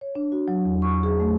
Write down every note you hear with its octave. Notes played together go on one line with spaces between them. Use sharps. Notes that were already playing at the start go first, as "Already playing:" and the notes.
C#5
D4
F#4
F#3
E2
C#6
G#4
A3